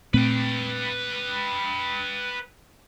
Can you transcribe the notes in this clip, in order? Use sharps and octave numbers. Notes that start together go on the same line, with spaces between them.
A#2 A3 C4 B4 G5